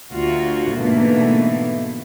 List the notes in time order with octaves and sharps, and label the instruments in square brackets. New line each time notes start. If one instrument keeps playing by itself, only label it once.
[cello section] D2 F4 F#4
G#2 B2 D3 E3 A3 A#3